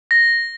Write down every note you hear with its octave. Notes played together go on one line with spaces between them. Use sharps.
A#6